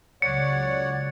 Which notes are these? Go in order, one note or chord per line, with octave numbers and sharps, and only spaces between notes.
C#2 C#3 F#3 C#5 D5 F#5 C#7